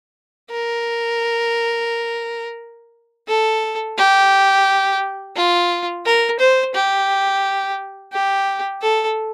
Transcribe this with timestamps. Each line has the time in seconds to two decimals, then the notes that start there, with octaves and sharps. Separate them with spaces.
0.51 A#4
3.28 A4
3.98 G4
5.36 F4
6.05 A#4
6.39 C5
6.74 G4
8.13 G4
8.82 A4